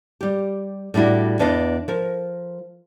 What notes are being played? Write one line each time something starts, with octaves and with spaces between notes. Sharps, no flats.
G3 G4
A2 G3 D4 E4 F#4
E2 D4 B4 D#5 F5
F3 A#4